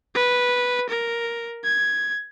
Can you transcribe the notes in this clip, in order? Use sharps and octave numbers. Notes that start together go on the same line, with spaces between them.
B4
A#4
G#6